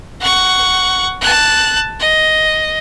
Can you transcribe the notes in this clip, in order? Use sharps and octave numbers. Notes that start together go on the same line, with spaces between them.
F#5 C#6
A5 F#6
D#5